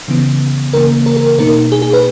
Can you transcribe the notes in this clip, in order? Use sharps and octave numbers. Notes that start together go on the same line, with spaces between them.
C#3 E3 B3
C#3 E3 A#3 A#4
A#4
A#4
B2 A#3 D#4 A#4
G#4
G#4
B4